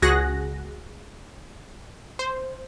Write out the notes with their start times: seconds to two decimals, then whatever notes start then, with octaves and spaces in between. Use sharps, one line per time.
0.02 C#2 F#4 G#4 F#5 F#6 A#6
2.19 C5